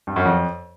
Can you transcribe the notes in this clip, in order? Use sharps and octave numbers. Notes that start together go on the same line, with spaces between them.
G2
F#2
F2